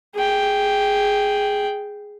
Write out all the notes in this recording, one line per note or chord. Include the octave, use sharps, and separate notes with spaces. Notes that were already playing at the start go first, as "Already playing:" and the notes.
G#4 G5